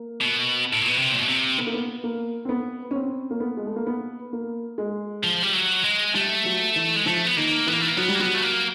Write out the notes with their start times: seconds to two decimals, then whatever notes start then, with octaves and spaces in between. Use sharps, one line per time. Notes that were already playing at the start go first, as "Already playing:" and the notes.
Already playing: A#3
0.21 B2
0.73 A2
0.82 A#2
0.89 B2
0.97 C3
1.12 A#2
1.19 B2
1.28 C3
1.58 B3
1.67 A#3
1.74 B3
2.04 A#3
2.45 C4
2.49 B3
2.91 C#4
2.96 C4
3.30 A#3
3.40 B3
3.57 G#3
3.66 A3
3.76 A#3
3.87 B3
4.33 A#3
4.78 G#3
5.23 F3
5.43 G3
5.54 F#3
5.84 G#3
6.14 G3 A3
6.45 F#3
6.76 E3
6.96 G#3
7.06 F3 A3
7.26 B3
7.36 D#3 A#3
7.67 E3 B3
7.73 A#3
7.82 A3
7.88 A#3
7.97 F#3 B3
8.08 G3
8.15 A#3
8.19 F#3 B3
8.35 A3
8.42 A#3